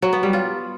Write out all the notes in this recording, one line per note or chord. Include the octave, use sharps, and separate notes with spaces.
F#3
B3
G3
F4